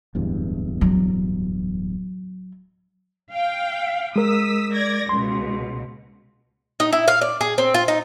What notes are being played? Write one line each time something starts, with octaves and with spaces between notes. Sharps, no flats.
D1 E2 G2
F#3
F5 G5
G#3 A#4 D#6 E6 B6
D5 G#6 A#6
C#2 B2 C6
D#4
E4
F5
D5
G#4
C4
F4
D#4